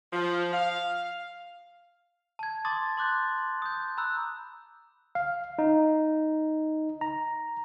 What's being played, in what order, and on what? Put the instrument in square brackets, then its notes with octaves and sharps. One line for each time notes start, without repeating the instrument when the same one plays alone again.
[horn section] F3
F5
[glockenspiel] A5 G#6
A5 C6 D6 D#6 A6
C6 D6 F#6 G6 A6
D#6 G6
A#5 B5 E6 F#6
[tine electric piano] F5
D#4
A#5